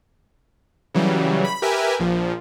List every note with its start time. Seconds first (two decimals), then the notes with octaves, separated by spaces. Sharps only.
0.94 C#3 E3 F#3 G3
1.45 B5
1.62 G4 A#4 B4 E5 G#5
2.00 A#1 A#2 F3